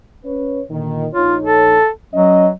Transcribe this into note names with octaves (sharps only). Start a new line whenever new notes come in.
C#4 B4 C#5
A#2 D3 D#3
A#1 D#4 F4 C#5
A4
F#3 C#4 D#5